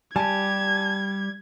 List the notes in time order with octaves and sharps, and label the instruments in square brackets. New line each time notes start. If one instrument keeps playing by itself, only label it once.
[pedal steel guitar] G3 G4 [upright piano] G#5 A5 [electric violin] G#6